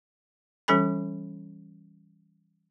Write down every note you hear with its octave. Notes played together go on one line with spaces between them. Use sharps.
E3 G3 C#4 A4 G#5 B5